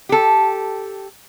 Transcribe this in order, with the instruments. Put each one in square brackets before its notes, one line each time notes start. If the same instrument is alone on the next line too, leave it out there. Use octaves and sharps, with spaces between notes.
[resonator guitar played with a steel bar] G4 A4